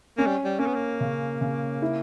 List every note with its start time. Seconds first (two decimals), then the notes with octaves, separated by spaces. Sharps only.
0.18 A#3 C#4
0.27 G3
0.45 G3
0.59 A#3 C#4
0.67 B3
0.75 A#3
1.01 C#3
1.41 C#3
1.82 E4